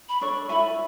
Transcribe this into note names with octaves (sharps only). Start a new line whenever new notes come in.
B5
D4 A4 C#5 C#6
E4 A4 E5 G#5 B5